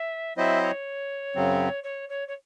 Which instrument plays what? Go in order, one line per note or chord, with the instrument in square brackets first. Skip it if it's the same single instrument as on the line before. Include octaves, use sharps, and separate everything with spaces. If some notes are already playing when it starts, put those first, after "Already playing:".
Already playing: [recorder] E5
[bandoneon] F#3 C4 E4 C5 D#5 [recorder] E5
[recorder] C#5
[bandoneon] F#2 C#3 F#3 C4
[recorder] C#5
C#5
C#5